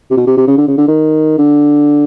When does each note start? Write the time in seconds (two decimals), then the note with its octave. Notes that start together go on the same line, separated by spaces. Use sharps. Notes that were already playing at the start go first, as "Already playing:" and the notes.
0.11 C3
0.17 B2
0.27 C3
0.37 C3
0.47 C#3
0.58 D3
0.67 C#3
0.77 D3
0.88 D#3
1.38 D3